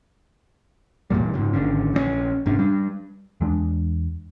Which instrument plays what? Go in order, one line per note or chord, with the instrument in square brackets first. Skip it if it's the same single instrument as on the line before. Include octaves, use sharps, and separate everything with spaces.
[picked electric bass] A1 F2 A#2 G3
G#2 C#3
G#1 D3 C#4
A#1 F3 C#4
F1 G#2 C#4 D4
G3 D4
E2 G#3 D4